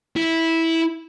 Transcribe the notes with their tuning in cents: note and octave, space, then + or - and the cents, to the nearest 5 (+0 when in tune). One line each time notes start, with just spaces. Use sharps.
E4 -10